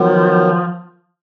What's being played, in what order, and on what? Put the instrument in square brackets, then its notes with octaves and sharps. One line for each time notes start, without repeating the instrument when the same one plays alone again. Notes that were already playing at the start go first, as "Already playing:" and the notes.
Already playing: [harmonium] D#3 F#3 B3 [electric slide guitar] F3